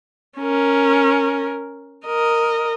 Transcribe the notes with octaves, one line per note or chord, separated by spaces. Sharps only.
C#4 A#4
A#4 D#5